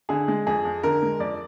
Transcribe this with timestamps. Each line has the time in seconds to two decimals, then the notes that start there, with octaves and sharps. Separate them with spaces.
0.09 D3 G#4
0.28 G#3
0.47 F2 G#4
0.65 F2
0.83 D3 A#4
1.03 G#3
1.20 F2 D5